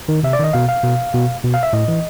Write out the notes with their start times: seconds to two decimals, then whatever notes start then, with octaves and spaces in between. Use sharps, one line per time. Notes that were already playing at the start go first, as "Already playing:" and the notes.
0.09 D#3
0.23 C3 E5
0.33 D5
0.39 D#3 D#5
0.53 B2 F5
0.69 F5
0.84 B2
1.14 B2
1.44 B2
1.54 F5
1.63 E5
1.73 A2 D#5
1.88 E3